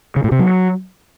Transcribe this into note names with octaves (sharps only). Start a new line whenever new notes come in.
C#3
A2
C3
F#3